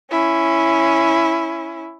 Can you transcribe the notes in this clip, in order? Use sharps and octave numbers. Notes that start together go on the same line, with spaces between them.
C#4 E4